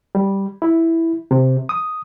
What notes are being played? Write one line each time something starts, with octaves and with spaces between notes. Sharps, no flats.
G3
E4
C3
D#6